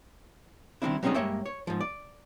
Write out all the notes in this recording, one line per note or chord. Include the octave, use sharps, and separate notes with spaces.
D#3 G3 G#3 C4 D4 E4
F#3 G3 C4 C#4 D#4 G#4
G2 G#3 A#3 C#5 E5 G5
C#5
G#2 F3
D5